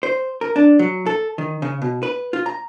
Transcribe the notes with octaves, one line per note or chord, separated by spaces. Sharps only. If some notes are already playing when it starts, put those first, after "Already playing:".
C5
A#4
D4
F#3
A4
D#3
C#3
B2
B4
F4
A#5